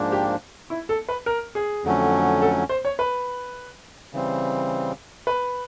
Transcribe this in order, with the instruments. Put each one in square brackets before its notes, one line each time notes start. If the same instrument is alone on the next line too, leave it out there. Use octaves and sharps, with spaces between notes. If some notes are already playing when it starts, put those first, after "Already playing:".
Already playing: [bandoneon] G#2 F3 A#3 D4
[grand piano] G4
E4
A4
B4
A#4
G#4
[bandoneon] F2 D3 F#3 A3 C#4
[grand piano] A4
C5
C#5
B4
[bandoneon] C#3 E3 G3 C4
[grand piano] B4